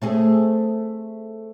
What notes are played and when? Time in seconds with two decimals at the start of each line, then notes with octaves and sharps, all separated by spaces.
0.02 A3 C4 G#4